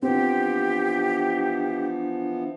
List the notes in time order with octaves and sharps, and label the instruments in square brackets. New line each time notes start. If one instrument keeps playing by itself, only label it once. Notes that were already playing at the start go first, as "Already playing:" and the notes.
[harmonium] E3 F3 B3 [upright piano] C4 [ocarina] D4 [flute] G4